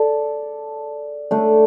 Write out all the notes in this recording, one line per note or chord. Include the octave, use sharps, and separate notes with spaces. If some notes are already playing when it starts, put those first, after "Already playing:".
Already playing: A4 D5
A3 D4